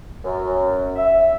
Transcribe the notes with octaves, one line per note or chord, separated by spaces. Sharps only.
F#2
E5